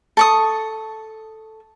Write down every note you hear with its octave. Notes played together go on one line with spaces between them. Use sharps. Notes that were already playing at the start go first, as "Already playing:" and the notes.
A4 C#6 D#6